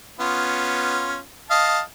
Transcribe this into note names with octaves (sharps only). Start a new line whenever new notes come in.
B3 C#4 F4
D#5 F5 A5